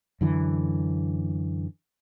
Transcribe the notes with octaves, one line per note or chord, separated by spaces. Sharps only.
F#2 D3 E3